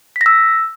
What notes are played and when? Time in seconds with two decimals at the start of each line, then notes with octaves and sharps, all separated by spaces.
0.16 B6
0.21 A#6
0.26 E6